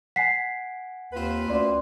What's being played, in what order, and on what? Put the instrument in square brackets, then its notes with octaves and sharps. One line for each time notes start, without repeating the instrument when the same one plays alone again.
[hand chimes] F#5 G#5 [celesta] B6 C7
[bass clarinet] D#2 [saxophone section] C4 F4 B4
[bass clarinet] D2 [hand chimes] C#4 D5 C6